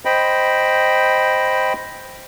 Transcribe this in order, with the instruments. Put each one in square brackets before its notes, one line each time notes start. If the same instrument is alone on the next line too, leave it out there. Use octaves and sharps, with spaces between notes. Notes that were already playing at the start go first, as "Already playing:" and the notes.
[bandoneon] C5 D#5 G5 B5